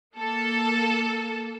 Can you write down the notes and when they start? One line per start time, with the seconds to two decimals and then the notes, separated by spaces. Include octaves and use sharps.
0.17 A#3 A4